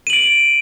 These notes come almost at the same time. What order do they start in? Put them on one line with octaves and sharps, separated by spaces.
D#7 F#7 D7